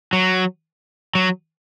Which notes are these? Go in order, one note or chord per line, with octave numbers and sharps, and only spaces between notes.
F#3
F#3